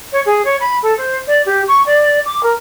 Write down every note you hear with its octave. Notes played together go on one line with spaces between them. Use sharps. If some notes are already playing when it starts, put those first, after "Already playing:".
C#5
G#4
C#5
B5
A4
C5
D5
G4
C#6
D5
D6
A#4